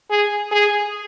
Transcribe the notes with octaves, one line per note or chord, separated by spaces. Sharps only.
G#4
G#4